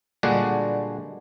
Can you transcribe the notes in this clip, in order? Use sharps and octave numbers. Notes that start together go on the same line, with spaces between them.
A#2 D3 G3 G#3 D4 F#4